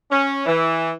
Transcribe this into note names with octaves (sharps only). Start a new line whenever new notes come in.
C#4
E3